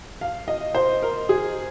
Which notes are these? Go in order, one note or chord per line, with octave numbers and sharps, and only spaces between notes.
F5
D#5
C5
A#4
G#4